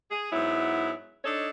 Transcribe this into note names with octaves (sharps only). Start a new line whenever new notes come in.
G#4
G#2 F#3 B3 E4
D4 D#4 A4 C#5 D#5